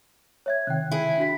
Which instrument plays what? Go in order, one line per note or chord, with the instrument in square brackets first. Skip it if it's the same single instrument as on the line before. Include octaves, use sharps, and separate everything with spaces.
[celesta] C#5 E5 G#6
[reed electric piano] C3 D#3 [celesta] G5 F#6
[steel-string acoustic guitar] E4 G#4
[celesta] D4 F#4 B6